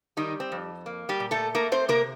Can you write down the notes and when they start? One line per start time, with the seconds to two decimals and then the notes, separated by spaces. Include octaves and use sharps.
0.17 D#3 G3 D#4
0.40 C4
0.52 F2
0.86 A#3
1.09 G3 G4
1.20 A#2
1.31 A3 A4
1.55 A3 A#3 A#4
1.72 C4 C5
1.88 C3 A#3 A#4